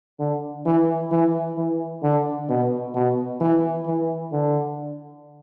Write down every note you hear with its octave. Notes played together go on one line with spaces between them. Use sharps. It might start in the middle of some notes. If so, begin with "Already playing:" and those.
D3
E3
E3
E3
D3
B2
B2
E3
E3
D3